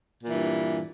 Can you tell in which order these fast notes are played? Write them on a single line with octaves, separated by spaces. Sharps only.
A#2 E3 G2